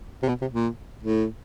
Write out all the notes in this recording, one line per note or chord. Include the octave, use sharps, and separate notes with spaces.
C3
B2
C3
A#2
A2